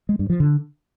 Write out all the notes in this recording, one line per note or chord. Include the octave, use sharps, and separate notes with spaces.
G#3
G2
F3
D3